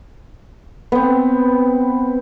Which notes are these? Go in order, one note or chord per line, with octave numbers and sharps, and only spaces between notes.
B3 C4